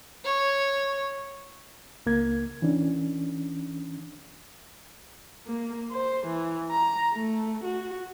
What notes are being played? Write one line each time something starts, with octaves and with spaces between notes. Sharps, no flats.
C#5
C#2 A#3 G#6
E3 C#4 D4
A#3
C5
E3
A#5
A3
F#4